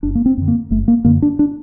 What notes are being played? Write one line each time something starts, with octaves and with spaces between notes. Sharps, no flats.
F#1 D4
A#3
C4
F#2 D3
A#3
F#1 A3
A#3
F#2 D3 A#3
D4
D4